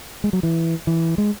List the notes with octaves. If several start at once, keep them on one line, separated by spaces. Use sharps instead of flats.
G#3
F#3
E3
E3
G#3